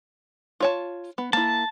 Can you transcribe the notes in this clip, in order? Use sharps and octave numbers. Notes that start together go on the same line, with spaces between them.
F4 C#5 A5
B3
A#3 E4 A5